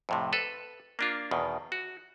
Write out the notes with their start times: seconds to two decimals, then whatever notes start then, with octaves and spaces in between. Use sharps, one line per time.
0.09 F2 A2 C3
0.33 A4 B4
0.99 A#3 D4 F4
1.31 E2 B2 D#3
1.72 F#4